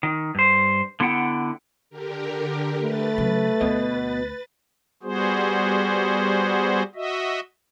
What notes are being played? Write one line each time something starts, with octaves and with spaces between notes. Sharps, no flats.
D#3
G2 C5
D3 B3 E4 F#5 G5
D3 G4 A#4
A3 B4 A6
C#3 F#3
D2 B2 D#5
G3 B3 F#4 G#4 C5
F#4 D#5 E5